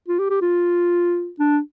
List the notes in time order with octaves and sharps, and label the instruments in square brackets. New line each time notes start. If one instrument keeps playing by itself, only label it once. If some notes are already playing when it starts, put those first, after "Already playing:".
[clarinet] F4
G4
G4
F4
D4